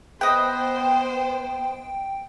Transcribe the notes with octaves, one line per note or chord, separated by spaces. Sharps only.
B3 B4 C5 D#5 G5